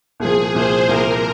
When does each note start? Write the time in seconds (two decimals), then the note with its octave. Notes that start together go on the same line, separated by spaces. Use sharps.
0.20 C2 A#2 F3 G#4
0.55 C2 A#2 F3 C5
0.89 C2 A#2 F3 A#4